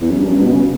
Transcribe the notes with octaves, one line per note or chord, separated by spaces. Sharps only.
E2
F#2
G2
F#2
G2
B2
C#3